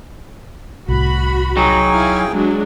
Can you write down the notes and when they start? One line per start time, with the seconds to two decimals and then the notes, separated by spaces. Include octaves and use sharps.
0.88 C2 A2 F#4 B5
1.57 F#3 D#4 G#4 G5
1.90 E4 F5 G#5
2.31 F#3 G#3 D4